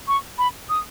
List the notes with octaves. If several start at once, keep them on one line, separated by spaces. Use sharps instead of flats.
C#6
B5
D#6